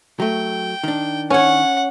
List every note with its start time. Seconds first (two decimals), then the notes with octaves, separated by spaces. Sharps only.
0.20 F#3 A3 G5
0.84 D#3 D4
1.30 C#4 C#5 F#5